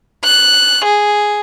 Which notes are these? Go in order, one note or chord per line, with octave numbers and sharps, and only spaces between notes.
F#6
G#4